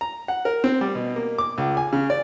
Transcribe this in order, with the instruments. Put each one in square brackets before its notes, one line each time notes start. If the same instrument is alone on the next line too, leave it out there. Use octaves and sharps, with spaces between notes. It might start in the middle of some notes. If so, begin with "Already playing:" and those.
[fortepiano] A#5
F#5
A#4
C4
G3
B2
A#3
D6
C#2
G#5
C#3
D5